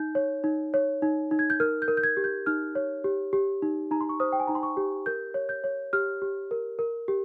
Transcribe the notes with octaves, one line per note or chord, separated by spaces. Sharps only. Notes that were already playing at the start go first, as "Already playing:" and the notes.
Already playing: D#4 G6
C#5
D#4
C#5
D#4
D#4
G#6
G6
A#4 F6
G6
A#4
G6
G#6
G4
G6
D#4 F6
C#5
G4
G4
D#4
D#4 A#5
C6
C#6
C5 D#6
G5
G#5
D#4 A#5
C6
C#6
G4
A#4 G6
C#5
G6
C#5
G4 F6
G4
A#4
A#4
G4